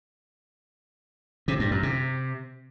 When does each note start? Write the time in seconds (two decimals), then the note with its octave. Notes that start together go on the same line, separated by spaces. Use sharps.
1.48 C3
1.60 G2
1.71 F#2
1.83 C3